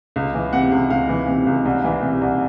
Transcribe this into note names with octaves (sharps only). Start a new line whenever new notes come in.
C#2
E3
C3 F#5
C#2
C#2 F5
E3
C3
C#2
C2
E3
C3
C2